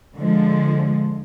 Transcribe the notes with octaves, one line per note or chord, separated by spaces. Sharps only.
D3 F3 G#3